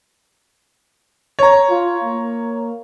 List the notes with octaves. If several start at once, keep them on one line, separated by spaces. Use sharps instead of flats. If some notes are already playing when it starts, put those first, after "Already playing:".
C#5 A#5
F4
A#3